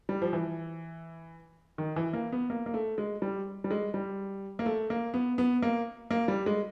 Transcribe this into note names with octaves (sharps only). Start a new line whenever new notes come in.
G3
F3
E3
D#3
E3
A#3
B3
A#3
A#3
A3
G#3
G3
G3
G#3
G3
A#3
A3
A#3
B3
B3
A#3
A#3
G3
G#3